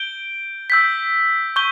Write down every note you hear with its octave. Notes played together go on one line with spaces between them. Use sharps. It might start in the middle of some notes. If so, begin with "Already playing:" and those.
Already playing: G6 D7 G7
E6 G6 B6
C#6 G6 G7